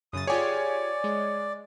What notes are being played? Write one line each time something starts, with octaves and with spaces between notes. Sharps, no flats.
F#2 C#3 D#6 A6
F4 G4 G#4 C#5 D5 G#5
G#3